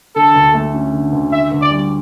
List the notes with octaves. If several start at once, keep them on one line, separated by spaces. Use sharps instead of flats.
D3 A4
D2
A3
C#4
D3
D2
D3 E5
D2
D5
G3